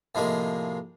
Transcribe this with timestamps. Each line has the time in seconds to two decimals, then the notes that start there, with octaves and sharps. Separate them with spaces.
0.15 A2 C3 F3 G#3 A#3